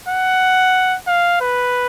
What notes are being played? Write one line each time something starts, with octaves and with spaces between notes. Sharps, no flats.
F#5
F5
B4